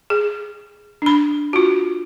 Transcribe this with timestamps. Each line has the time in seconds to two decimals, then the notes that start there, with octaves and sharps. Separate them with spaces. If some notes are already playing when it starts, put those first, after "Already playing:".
0.10 G#4
1.02 D4 B5
1.53 F4 F#4